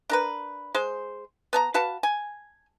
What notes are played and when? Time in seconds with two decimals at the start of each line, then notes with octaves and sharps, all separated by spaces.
0.10 D4 A#4 B4
0.74 G#3 C5
1.53 B3 A5 A#5
1.74 F#4 B4 F5 A5
2.03 G#5